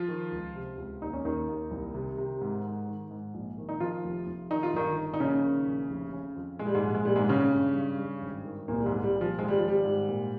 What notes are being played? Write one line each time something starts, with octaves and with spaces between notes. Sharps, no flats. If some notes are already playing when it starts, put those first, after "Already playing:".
Already playing: F3 F4
D#3
C#2
C3
C#2
D#2 D#4
C#4
D#2 D#3 D#4
D#2
C2
C3
C3
G#2
G#2
D#3
G#2
A#1
D#3
D#4
D#3 F3 F4
F1
F1
D#3 D#4
F4
G1 D#3 D#4
D#3
D#4
A#1 C#3 C#4
D#3
A#1
F1
C#3
F2
A#2 G#3
G3
G#2 G#3
A#1
G#3
A#2 G3
G#2 G#3
G#1 C#3 C#4
G2
G2
G2
G#1
D#3
C2 A#2 A#3
G3
G#2 G#3
C2
G3
A#2
F3
G#1 G#3
G3
G#1 F3
G3
G#2
A#2